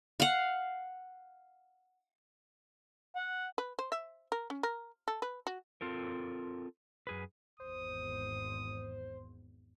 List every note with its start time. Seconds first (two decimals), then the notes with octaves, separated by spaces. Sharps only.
0.20 F5 F#5
3.15 F#5
3.58 B4
3.79 C5
3.92 E5
4.32 A#4
4.50 C#4
4.63 A#4
5.08 A4
5.22 B4
5.47 F#4
5.81 C4 F4 A4 A#4
7.07 F#2 G#4 B4
7.60 G#1 E2 C5 D#6